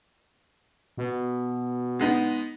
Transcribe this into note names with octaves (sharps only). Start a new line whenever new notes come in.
B2
G#3 B3 D#4